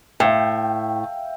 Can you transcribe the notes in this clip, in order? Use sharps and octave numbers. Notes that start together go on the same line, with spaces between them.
A2 E5 F5 G5